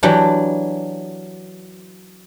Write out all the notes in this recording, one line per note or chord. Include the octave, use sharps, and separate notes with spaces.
E3 F#3 D4 G4